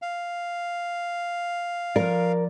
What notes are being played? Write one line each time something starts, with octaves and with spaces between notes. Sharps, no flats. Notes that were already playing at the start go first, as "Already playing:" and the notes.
F5
F3 A#4 D5